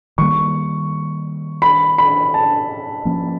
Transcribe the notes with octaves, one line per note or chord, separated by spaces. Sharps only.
D#3 G3 A#3 C#6
B5
B5
A5
F3 A#3 C#4